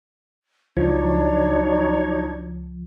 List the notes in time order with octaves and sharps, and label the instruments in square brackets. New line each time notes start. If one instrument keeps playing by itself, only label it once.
[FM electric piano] C#2 F3 [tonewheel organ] F#3 D#4 C#5 [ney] D4